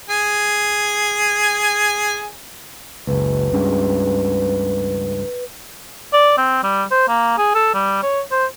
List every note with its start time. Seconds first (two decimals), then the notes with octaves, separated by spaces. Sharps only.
0.09 G#4 G#5
3.07 F#1 C#2 B4
3.52 C#2 G2 C#3
6.13 D5
6.38 C4
6.63 G3
6.91 C5
7.08 A#3
7.38 G#4
7.55 A4
7.74 G3
8.03 C#5
8.31 C5